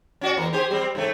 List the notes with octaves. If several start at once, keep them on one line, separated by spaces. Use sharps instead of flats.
C#4 F#4 D5
E2 A#3
G4 G#4 C5
G3 C4
G#2 C#3 A3